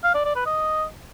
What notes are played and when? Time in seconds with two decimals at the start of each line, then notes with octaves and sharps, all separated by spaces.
0.04 F5
0.14 D5
0.25 D5
0.36 B4
0.46 D#5